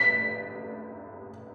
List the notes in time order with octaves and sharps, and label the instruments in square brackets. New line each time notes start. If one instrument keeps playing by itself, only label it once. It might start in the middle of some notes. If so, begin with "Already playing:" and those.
Already playing: [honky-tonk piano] B6